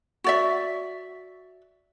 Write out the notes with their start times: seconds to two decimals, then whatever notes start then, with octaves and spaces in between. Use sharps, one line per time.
0.24 F#4 D5 E5